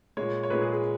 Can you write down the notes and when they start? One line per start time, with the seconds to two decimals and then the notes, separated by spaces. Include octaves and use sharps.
0.17 A#2 G#3 C#5
0.43 C#5
0.50 A#2 G#3 B4
0.61 G#4
0.72 G#4